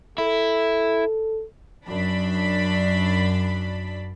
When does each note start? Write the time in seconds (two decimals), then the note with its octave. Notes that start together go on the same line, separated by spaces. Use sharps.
0.18 E4 A4
1.85 F#2 D4 B5